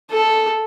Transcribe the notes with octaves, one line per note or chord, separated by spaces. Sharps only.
A4